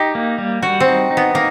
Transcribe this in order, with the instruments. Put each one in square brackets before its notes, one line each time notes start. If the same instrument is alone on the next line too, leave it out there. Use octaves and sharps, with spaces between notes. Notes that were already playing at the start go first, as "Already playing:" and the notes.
Already playing: [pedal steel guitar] D#4 [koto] G4
[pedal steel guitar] A#3
G3
[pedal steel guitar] G3 [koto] F#4
[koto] C4
[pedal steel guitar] D#4
D#4
[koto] B3
[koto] A#3 [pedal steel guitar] D#4